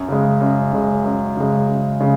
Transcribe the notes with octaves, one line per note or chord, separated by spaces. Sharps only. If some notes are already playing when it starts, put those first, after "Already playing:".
Already playing: F#2
C#3 G#3
F#2
C#3 G#3
F#2
C#3 G#3
F#2
C#3 G#3